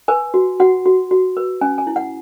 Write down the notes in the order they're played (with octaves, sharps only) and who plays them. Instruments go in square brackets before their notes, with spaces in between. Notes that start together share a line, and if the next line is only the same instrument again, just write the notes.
[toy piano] B4 G#5
F#4
F#4 F#5
F#4
F#4
B4
C#4 G#5
G#5
E4
F#5